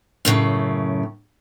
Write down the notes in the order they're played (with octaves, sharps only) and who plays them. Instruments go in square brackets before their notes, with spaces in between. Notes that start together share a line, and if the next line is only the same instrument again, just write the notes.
[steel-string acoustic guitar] F#2 A2 C#3